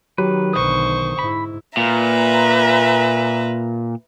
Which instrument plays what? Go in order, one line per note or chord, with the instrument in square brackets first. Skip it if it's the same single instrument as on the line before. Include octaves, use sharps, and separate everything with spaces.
[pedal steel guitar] D#3 B4 [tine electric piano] F#3 G4
[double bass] B1 D3 [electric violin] C5 C#6 [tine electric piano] D#6
[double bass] G#2 E4 [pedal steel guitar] B5
[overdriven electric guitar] A#2 [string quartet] B4 E5 A#5